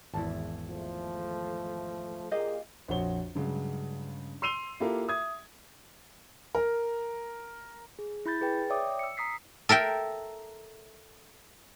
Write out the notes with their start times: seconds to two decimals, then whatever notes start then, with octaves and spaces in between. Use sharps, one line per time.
0.14 G#1 E2 E4 A5
0.70 F3 A3
2.31 A#2 A#3 G4 G#4 D#5 F5
2.88 A#1 F2 F#4 C#5 G7
3.35 G2 C#3 F#3 G#3
4.42 C6 E6 C7 D#7 F7 G7
4.80 A#3 E4 F4 G4 A4 A#4
5.08 E5 D#6 G#6
6.55 A#4
7.99 G#4
8.26 E4 B5 G6 A6
8.41 G#4 B4 G5 A6
8.70 C#5 D5 E5 G5 D6 D#6
8.99 E6 C#7
9.17 A#5 D#6 B6 C7
9.69 A4 A#4 E5 G5